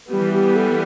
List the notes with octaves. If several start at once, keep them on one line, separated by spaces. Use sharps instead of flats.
E3 G3 B3 G4
G4
A4